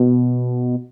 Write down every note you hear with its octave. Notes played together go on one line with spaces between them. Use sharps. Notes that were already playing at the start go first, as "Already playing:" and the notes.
Already playing: B2